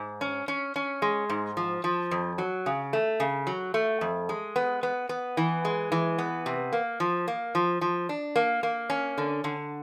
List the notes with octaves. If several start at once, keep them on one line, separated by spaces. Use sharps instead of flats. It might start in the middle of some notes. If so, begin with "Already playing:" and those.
Already playing: G#2
C#4
C#4
C#4
G#3
G#2
F3
F3
F2
F#3
C#3
A3
C#3
F#3
A3
F2
G#3
B3
B3
B3
E3
G#3
E3
B3
C3
A#3
F3
A#3
F3
F3
D4
A#3
A#3
C#4
D3
D3